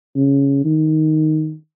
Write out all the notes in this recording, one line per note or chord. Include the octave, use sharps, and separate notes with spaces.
C#3
D#3